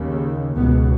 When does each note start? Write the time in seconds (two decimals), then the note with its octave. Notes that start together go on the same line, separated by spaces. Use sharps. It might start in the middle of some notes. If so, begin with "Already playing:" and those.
Already playing: D#2 C#3
0.55 C#2 B2 B3